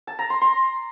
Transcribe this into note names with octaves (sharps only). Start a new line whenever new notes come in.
A5
A#5
C6
C6